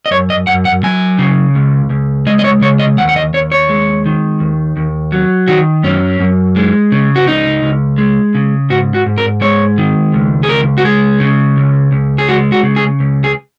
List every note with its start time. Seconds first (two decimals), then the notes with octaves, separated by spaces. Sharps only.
0.06 D#5
0.11 F#2 C#5
0.30 D#5
0.47 F#2 F#5
0.65 F#5
0.83 F#3 G#5
1.19 C#3
1.55 C#2
1.90 C#2
2.26 G#3 D#5
2.39 D#5
2.44 C#5
2.62 C#3 C#5
2.79 D#5
2.98 D#2 F#5
3.09 F#5
3.16 D#5
3.34 D#2 C#5
3.52 C#5
3.69 G#3
4.06 D#3
4.40 D#2
4.77 D#2
5.12 F#3
5.48 D#3 F#4
5.83 F#2 C#4
6.20 F#2
6.56 G#3
6.92 C#3
7.16 F#4
7.27 C#2 D#4
7.63 C#2
7.98 G#3
8.35 C#3
8.70 G#2 F#4
8.94 F#4
9.06 G#2
9.18 A#4
9.41 G#3 C#5
9.78 D#3
10.13 C#2
10.43 G#4
10.49 C#2 A#4
10.78 F#4
10.85 G#3 G#4
11.20 C#3
11.57 C#2
11.92 C#2
12.18 G#4
12.28 G#3 F#4
12.52 F#4
12.63 C#3
12.76 G#4
13.00 C#2
13.24 G#4